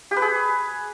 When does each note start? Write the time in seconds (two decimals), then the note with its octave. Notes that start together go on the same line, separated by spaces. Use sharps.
0.11 G4
0.17 B4
0.22 G#4